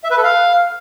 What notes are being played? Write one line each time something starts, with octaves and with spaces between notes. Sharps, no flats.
E5
B4
A4
F5